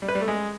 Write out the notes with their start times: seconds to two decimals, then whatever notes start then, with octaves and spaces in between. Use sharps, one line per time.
0.02 G3
0.08 B4
0.15 G3
0.21 A3
0.28 G#3